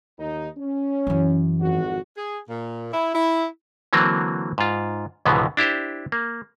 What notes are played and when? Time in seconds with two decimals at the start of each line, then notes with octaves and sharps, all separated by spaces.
0.18 D#2 D#4
0.57 C#4
1.07 F#2 E3
1.60 G#1 F2 F#4
2.17 G#4
2.49 A#2
2.92 E4
3.14 E4
3.93 D3 E3 F#3 A#3 C4
4.58 G#2 F4
5.25 C#2 G#2 B2 D3 E3 B3
5.57 D4 E4 G4 C5
6.12 A#3